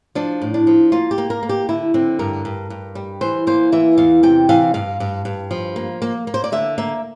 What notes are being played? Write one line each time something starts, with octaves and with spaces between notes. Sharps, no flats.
F3 D4
A2
D4
F3
A#3 F4
G4
A#3
A#4
A#3
G4
D3 E4
D3 C4
G2 A#4
G2
G2
G3
E3 C5
A#3 C5
E3 E5
E2 F5
C3 G5
E3 F5
G2 F5
G2
G2
F3
A#3
A#3
A#3
C5
D5
D3 E5
A#3 E5